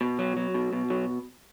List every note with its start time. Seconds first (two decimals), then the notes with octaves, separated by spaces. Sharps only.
0.01 B2
0.19 F#3
0.37 F#3
0.54 B2
0.73 B2
0.90 F#3